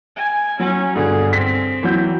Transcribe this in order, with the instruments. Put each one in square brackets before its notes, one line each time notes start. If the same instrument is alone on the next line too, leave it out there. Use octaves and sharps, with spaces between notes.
[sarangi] G#5
[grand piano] F#3 [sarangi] C#4
[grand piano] G2 B2 D3 [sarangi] G#4
[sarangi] C4 [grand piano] B6
[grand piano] E3 F#3 G6